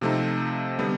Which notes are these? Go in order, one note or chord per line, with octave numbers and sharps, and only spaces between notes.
C3 F3 A3 C4 D#4
D3 G3 B3